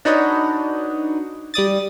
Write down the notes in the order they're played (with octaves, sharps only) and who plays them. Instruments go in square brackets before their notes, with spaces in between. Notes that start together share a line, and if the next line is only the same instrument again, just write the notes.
[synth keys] D4 D#4 F#4 B4 C#5 D#5
G3 D5 D#6 A6